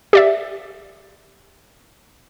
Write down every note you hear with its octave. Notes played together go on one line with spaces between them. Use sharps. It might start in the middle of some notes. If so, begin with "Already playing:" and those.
G4 D5 E5